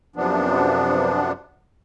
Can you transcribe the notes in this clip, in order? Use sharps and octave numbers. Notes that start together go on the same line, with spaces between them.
F#2 C3 F3 B3 D4